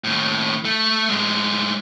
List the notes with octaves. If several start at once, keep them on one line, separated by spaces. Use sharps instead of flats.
D#2 A2
A3
A2 G#3